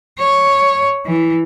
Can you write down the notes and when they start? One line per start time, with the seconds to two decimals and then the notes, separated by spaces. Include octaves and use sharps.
0.19 C#5
1.06 E3